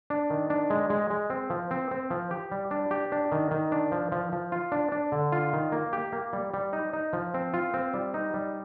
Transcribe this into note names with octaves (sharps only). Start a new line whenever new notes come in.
D4
D#3
D4
G#3
G#3
G#3
C4
F3
C4
C4
F3
G4
G3
D4
G4
D4
D#3
D#3
D4
F3
F3
F3
F4
D4
D4
D3
F4
D#3
A#3
G4
A#3
G3
G3
D#4
D#4
F3
C4
F4
C4
G3
D#4
G3